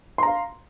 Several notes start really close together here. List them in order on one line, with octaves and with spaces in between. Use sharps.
C6 A#5 F5